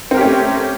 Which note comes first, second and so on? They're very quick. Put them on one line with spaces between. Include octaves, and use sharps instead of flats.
C4 A#4 G4 C#4 A3